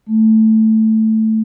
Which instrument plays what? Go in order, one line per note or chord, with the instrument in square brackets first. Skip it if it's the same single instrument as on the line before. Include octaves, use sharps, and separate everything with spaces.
[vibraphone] A3